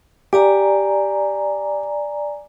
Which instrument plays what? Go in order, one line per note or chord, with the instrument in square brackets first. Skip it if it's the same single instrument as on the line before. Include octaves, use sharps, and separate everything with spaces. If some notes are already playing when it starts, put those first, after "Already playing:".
[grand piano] G4 [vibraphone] D5 G#5 A#5